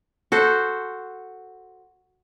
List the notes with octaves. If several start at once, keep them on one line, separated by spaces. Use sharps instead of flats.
F#4 A4 C5